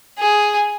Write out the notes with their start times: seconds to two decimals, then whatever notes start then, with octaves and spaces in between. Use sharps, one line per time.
0.19 G#4